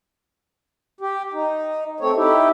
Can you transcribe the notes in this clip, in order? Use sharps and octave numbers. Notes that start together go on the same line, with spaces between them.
G4
D#4
A3 C4 C#5
D#4 E4 G4